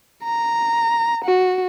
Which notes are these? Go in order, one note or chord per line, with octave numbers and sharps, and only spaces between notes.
A#5
F#4